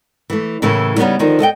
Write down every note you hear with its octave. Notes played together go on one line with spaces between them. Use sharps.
E3 A3
A2 C#3 E3 A3 A#3 E4
C#3 G3 A#3 B3 C#4 D#4
D3 D#3 F3
A4 D#5 F#5 G5